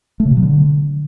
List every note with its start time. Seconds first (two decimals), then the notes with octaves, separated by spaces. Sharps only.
0.20 A3
0.25 C#3
0.31 B2
0.37 F#3
0.42 D3